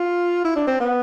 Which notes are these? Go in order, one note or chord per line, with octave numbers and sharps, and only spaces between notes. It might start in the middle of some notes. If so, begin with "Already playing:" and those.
Already playing: F4
E4
D4
C4
B3